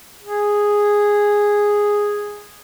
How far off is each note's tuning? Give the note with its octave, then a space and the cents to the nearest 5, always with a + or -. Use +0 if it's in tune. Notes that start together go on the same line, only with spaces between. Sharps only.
G#4 -5